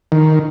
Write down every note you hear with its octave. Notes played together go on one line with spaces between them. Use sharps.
D#3